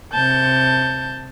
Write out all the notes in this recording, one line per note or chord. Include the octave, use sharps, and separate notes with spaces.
C3 A5 G6